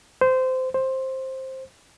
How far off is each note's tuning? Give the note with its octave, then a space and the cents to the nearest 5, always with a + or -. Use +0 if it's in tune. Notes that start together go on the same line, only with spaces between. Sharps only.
C5 -20
C5 +10